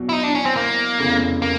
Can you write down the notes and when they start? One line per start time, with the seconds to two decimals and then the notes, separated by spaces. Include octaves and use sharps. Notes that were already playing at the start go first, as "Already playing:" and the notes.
Already playing: E2 B2 F#3
0.09 E4
0.13 D#4
0.24 D4
0.35 C#4
0.45 C4
0.56 A#3
0.99 F1 E2 C#3
1.42 A#3